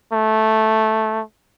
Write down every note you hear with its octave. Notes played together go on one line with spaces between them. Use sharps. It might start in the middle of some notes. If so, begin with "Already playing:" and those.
A3